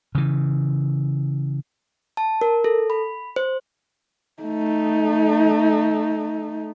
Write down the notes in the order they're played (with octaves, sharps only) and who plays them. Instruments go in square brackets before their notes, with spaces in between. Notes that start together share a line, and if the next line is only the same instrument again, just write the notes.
[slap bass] C#3 E3
[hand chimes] A5
A#4
A4
B5
C5
[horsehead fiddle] A3 D#4